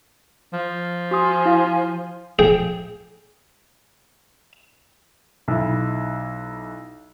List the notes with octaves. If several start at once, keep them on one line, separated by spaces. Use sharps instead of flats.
F3
F#4 G#5 C6 D#6
E4 F5
G#4 G5
B1 E4